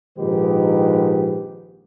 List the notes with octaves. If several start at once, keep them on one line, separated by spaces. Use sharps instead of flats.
A#1 G#2 D#3 G4 B4